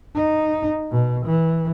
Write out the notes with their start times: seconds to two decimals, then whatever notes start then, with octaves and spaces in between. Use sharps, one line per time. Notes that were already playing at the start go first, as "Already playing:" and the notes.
0.15 D#4
0.91 B2
1.26 E3